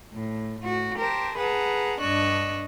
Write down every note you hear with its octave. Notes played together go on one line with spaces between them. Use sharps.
A2
A2 F#4
G4 A#4 C5 A5
G#4 B4 F#5 A5 A#5
G2 D4 D#5 C#6 E6 F#6